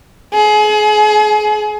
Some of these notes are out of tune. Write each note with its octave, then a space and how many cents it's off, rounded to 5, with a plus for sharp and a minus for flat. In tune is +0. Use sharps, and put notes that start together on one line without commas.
G#4 +30